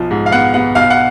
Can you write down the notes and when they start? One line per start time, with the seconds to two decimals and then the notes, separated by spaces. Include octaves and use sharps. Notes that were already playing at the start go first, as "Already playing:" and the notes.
Already playing: B1 F3
0.11 G#2
0.26 F5
0.32 B3 F#5
0.54 B3 F#5
0.75 B1 F5
0.90 F#5